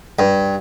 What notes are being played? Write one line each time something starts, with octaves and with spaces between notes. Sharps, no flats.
G2